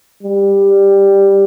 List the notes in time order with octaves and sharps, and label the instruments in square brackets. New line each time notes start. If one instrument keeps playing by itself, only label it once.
[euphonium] G3